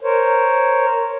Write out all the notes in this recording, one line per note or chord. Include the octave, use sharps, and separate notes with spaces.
A#4 C5 C#5